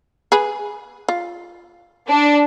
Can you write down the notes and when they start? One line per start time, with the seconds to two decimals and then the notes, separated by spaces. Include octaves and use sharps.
0.32 G#4 B4
1.09 F4
2.08 D4